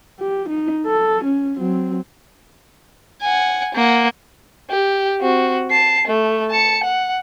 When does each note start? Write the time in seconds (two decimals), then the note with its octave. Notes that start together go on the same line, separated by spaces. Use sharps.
0.19 G4
0.49 D#4
0.87 A4
1.24 C#4
1.58 F#3 C4
3.22 F#5 G#5
3.74 A#3 F#5
4.70 G4
5.21 C4 F#4
5.70 A5 C7
6.07 A3
6.50 A5 C#7
6.83 F#5